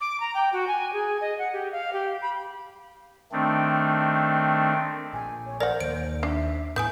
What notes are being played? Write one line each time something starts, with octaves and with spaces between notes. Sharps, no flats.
D6
A#5
G5
F#4
G#5
G#4
D#5
F#5
G4
F5
G4
B5
D#3 A3 C4 D4
A#1 G#5
C#5
A#4 C5 D5 F#5
D#2 D7
D4 E5
A2 B3 E4 G#5 D#6 G6